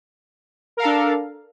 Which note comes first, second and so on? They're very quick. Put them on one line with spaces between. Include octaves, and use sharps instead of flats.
A#4 F5 A4 D4